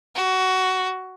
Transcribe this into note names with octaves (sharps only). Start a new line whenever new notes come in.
F#4